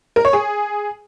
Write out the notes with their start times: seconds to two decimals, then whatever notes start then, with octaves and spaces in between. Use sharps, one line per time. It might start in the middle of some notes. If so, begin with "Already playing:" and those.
0.16 A#4
0.25 C#5
0.33 G#4